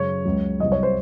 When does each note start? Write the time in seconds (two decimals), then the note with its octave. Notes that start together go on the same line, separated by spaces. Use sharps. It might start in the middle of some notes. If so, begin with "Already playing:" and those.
Already playing: F#2 C#3 F#3 C#5
0.25 C#2 C#3 F#3
0.59 C2 C3 F#3 D#5
0.72 C#5
0.83 C5